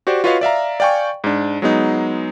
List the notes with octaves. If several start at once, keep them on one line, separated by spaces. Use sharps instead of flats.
F#4 G4 C5 D5
F4 F#4 B4 C#5 D#5 F5
D5 E5 F5 A#5
D5 F5 G5 G#5 C#6
G#2 D4
F#3 G#3 B3 D#4